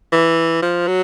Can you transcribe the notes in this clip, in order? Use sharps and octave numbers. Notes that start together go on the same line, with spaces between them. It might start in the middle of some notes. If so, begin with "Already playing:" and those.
E3
F3
F#3